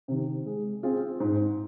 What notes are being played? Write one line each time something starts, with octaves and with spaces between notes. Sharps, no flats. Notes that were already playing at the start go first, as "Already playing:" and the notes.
C3 D#3
G#3
C4 F4 G#4
G#2